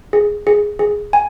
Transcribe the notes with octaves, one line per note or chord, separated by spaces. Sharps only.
G#4
G#4
G#4
G#5